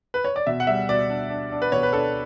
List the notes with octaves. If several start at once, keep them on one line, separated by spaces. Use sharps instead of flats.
B4
C#5
D5
B2 E5
F#5
G3 E5
B2 D5
D4
D4
D4
B4
B2 C#5
B4
D4 A4